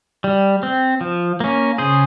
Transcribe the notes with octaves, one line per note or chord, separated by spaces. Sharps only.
G3
C4
F3
A#3 C#4
C#3 G#4 C5